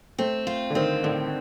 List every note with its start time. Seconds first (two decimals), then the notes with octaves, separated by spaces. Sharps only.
0.18 A3 C4
0.47 F4
0.70 D3
0.75 D#3 C4
1.04 A2 D3